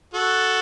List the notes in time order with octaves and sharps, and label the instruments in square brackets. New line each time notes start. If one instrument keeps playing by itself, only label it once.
[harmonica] F#4 A4